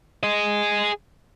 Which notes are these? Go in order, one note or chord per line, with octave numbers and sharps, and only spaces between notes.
G#4 D#5